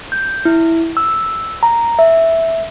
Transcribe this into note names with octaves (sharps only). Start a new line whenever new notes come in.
G6
E4
E6
A#5
E5